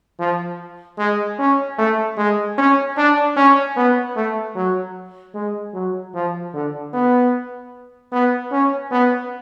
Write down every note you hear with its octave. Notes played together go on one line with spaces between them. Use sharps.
F3
G#3
C#4
A3
G#3
C#4
D4
C#4
B3
A3
F#3
G#3
F#3
F3
D3
B3
B3
C#4
B3